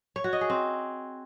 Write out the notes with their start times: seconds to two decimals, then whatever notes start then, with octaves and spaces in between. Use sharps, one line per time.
0.16 C#5
0.24 F#4
0.33 D#5
0.41 G#4
0.50 C4